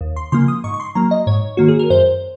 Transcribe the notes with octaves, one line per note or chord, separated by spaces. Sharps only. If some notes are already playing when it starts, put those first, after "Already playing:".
D#2
C6
C#3 F3 A#3 C6
D#6
G#2 C#6
C#6
C6
F#3 A#3 A#5
D#5
G#2 C#5
D#3 A#3 F#4
G#4
A#4
F#2 C5